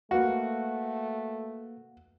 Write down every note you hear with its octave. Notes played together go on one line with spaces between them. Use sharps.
A3 A#3 F#4 B4 F5